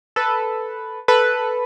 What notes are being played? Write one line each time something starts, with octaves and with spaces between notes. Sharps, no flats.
A4 B4
A4 B4